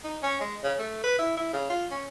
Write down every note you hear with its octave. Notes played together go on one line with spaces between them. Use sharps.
D#4
C#4
G#3
C#3
A3
B4
E4
E4
C#3
F4
C#4